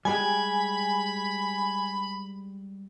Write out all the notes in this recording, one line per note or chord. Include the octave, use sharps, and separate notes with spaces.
G3 G#3 G4 G#5 B5